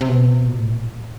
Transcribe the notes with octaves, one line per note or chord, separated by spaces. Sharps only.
C3
B2
A#2
A2